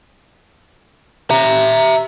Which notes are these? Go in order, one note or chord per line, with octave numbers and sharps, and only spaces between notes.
E5 A#5